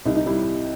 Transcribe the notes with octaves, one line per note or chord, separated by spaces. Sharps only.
C2 D#4
D#4
G3 E4